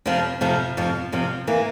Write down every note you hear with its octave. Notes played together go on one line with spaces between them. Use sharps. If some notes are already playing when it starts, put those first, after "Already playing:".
F2 C3 F3
F2 C3 F3
F2 C3 F3
F2 C3 F3
E3 A#3